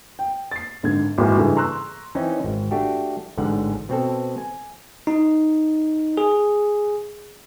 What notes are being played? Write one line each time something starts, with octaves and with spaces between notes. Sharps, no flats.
G5
A6 C7
G#1 D3 G#6
G#1 E3 A#3 F#4 A#4
G2 C#3 E3 A3
A#5 C6 C#6 E6 F#6
E3 C4 C#4 D#4
G#1
A3 D4 F#4 G4
A1 G#2 D3 F#5
B2 C4 A4
G#5
D#4
G#4